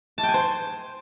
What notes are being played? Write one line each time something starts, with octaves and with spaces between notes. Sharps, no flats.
A5
G5
G#5
C5